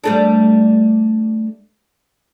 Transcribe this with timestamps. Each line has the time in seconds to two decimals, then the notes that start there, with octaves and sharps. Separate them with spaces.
0.04 G3 A3 D4